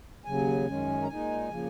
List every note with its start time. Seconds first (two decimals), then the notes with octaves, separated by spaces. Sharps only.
0.25 D#2 C#3 F#3 G#5
0.66 F#2 D#3 G#3 C#4
1.03 A#5
1.07 A#2 G#3 D#4 G#5
1.49 C#3 F3 A#3